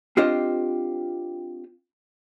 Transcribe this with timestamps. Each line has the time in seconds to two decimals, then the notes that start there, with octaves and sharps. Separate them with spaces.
0.17 C4 D4 F4 G4 C5 D#5